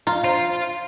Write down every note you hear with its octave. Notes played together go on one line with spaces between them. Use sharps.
F4 A#5
C5 F5 C6